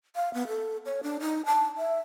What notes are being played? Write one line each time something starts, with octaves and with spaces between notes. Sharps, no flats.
F5
B3
A4
C#5
D4
D#4
A5
E5